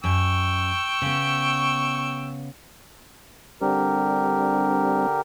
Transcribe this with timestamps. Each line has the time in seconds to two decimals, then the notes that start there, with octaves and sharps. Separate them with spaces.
0.04 F#2 G5 C#6 E6
1.02 C#3 B3
3.61 D3 G3 C4 D4 G4 A#4